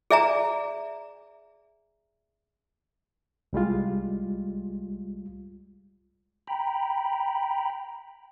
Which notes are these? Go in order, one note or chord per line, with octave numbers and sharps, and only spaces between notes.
G#4 D5 E5 G#5 A#5
C2 G3 G#3 F4
G5 A#5 B5